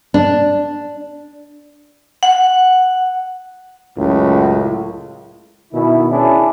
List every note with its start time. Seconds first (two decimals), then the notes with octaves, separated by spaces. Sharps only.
0.14 D4
2.23 F#5
3.98 C#2 F#2 A2
5.73 B2 D#3 E4
6.10 C#4 D4 E4 G#4